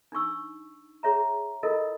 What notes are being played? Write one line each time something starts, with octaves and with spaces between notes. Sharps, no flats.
D4 D#4 C#6 E6
G#4 C#5 E5 A#5
E4 F4 A4 A#4 D#5